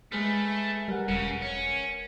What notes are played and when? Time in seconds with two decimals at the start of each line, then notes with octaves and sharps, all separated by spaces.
0.12 G#3 A3 B4 F6
0.88 G3 A#4 F#5
1.08 E1 C#3 C#4
1.42 C#4